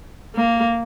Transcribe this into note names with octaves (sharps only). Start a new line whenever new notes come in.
A#3